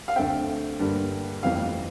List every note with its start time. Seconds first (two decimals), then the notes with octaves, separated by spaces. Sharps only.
0.08 F5
0.16 D2 D3 A3 C4 E5 G5
0.80 G2 D3 G3 A#3
1.43 F1 F2 E3 G3 C4 F5